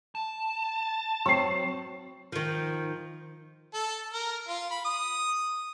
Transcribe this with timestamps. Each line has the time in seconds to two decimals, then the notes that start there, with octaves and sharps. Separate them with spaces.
0.15 A5
1.26 F#3 C4 C#6 C7
2.32 D#3 F3
3.74 A4
4.13 A#4
4.48 F4
4.71 B5
4.85 D#6